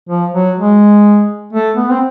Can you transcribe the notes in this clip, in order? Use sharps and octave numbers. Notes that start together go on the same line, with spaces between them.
F3
F#3
G#3
A3
B3
C4